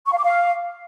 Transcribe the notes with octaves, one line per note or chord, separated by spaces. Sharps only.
C#6
F5
D6
F5